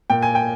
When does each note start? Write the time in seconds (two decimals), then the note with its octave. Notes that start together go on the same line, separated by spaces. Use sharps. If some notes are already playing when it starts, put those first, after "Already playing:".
0.10 A#2 G5
0.22 G#5
0.35 G5